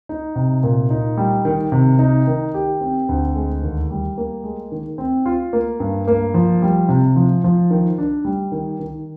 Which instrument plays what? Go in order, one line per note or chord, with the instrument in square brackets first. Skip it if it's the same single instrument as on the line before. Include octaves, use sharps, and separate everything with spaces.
[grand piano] D#4
C3
A#2
D#4
G3
D#3
C3
D#4
D#3
G4
C4
D2
G#3
D#2
G3
A#3
G#3
D#3
C4
F4
A#3
G2
A#3
F3
G3
C3
F3
F3
D#3
D4
G3
D#3
D#3